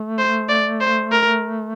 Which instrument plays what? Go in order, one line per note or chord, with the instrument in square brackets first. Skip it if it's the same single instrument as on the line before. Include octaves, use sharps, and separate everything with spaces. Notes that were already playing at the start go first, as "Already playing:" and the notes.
Already playing: [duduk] A3
[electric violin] C5
D5
C5
A#4